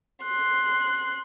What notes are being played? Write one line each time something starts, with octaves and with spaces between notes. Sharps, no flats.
C6 F#6